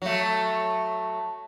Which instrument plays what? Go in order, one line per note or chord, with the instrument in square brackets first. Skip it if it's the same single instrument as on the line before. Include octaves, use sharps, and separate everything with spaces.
[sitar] F#3 A3